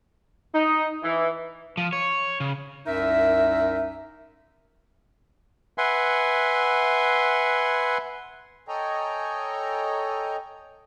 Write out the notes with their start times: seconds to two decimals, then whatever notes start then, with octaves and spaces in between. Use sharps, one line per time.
0.55 D#4
1.03 E3
1.77 F3
1.93 C#5
2.40 C#3
2.87 C2 F#2 D#4 A#4 E5
5.78 B4 E5 F#5 G#5 C6
8.68 A4 C#5 D#5 G5 G#5 A#5